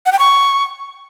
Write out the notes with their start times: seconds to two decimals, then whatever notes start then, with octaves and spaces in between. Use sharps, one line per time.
0.06 F#5
0.12 G5
0.19 C#6